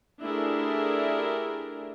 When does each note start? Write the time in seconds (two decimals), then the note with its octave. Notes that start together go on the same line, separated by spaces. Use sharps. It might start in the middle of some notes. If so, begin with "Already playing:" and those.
0.25 A3 D4 E4 G4 G#4 A#4